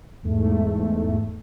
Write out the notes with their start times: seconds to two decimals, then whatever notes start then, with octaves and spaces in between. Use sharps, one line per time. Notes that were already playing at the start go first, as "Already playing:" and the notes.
0.23 E2 G#2 A3